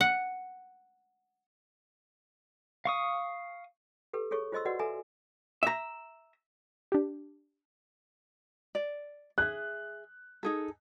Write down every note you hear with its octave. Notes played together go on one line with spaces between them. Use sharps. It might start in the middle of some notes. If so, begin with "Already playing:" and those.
F#5
F5 C#6 D#6
G4 A4 B4
G#4 A4 C#5 C#6
F4 C5 D#5 C6 E6
F#4 B4 D5 D#5 F#5
A4 E5 G#5 A#5
E5 A#5
D4 G4
D5
G#4 E5 F#6
D#4 G#4 A4